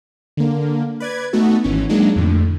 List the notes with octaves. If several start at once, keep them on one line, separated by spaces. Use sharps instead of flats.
D3 A#3
B4 D5 G#6
A3 B3 D#4 F#4 A4
G#1 E3 C#4
F#3 G#3 A#3 D4 D#4
F2 A2 D3